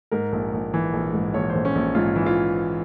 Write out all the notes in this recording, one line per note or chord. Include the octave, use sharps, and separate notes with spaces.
G#2 A#4
A#1
A#1
E3
A#1
G#2
A#1 C#5
C5
A#1
C#4
A#1
G#2 F4
E3
F4